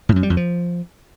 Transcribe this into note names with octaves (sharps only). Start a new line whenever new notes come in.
A2
F#2
G3
F2
F3